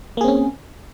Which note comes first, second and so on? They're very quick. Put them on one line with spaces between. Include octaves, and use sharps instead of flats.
A#3 G#4 C4 C#4